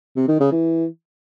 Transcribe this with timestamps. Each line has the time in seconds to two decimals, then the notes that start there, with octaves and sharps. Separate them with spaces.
0.16 C3
0.28 D#3
0.40 C#3
0.52 E3